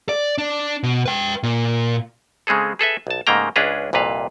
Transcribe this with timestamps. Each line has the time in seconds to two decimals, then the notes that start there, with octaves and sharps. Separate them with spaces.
0.09 D5
0.38 D4
0.83 B2
1.05 B4 G5
1.43 A#2
2.47 C#3 G#3 C4 G#4 A4
2.79 G#4 A4 B4 E5
3.07 B1 A5
3.27 G#2 C#3 A3 A#3 G5 A#5
3.56 C#2 C#4 D4 G#4 B4 A#5
3.93 C2 F2 A#2 B4 F5